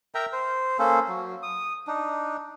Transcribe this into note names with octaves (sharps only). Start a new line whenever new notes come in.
A#4 E5 G5 A#5
C5
A#3 C#4 A4 C5
F#3
D#6
D4 D#4